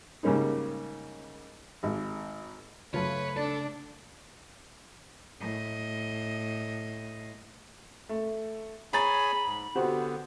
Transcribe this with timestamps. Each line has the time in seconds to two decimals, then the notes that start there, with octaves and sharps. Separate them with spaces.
0.23 G#2 C#3 G3 A#3 C#4 D#4
1.83 G#1
2.94 F#2 C#3 F#3 A3 F4 B4 C#5
3.37 D4 A4 D5
5.40 A2 D#5
8.09 A3
8.93 G#4 C#5 G#5 A#5 B5 A6
9.45 G#2
9.75 D3 B3 F#4 G4 C5